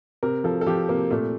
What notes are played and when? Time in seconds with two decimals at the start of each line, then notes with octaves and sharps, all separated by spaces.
0.23 C3 A#4
0.44 F3 A4
0.61 A4
0.66 F3 G4
0.89 C3 A#3
1.11 A#2 A3